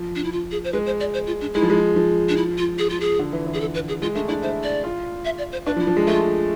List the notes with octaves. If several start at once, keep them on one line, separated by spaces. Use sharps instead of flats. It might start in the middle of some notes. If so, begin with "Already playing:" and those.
Already playing: F3
D4
E4
F4
G#4
C5
G#3 B4
C5
D5
C5
F4
D4
G#3 E4
F3
G#3
F3
D4
E4
F4
G#4
F4
G#4
D3
E3
E3
G#4
A4
B4
G#4
G#3 F4
A3 D4
D4 E4
E4 C5
D5
F4
E5
D5
C5
D4 B4
F3
E4
F3
G#3
A3 F4